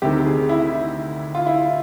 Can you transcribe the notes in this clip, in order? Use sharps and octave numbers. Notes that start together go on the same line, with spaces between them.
D2 C3 D#3 G4
G#4
E4
F4
E4